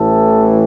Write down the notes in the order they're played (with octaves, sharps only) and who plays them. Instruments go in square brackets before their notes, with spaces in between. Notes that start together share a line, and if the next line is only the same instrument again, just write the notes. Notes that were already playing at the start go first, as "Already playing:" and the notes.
Already playing: [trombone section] A1 A2 E3 A3 A4